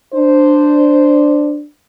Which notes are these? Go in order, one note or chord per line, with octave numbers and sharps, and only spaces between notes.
D4 C5